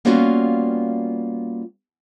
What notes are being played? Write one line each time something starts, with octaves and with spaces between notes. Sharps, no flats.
G3 A#3 B3 C#4 F4 F#4